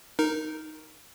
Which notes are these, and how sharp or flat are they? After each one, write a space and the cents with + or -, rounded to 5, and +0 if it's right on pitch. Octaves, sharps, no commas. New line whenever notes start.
D#4 +0 A#4 +0